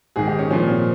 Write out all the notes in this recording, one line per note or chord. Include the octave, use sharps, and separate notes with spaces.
G#2 D#3 G#4
G4
C#4
A#2 F3 C#4
C4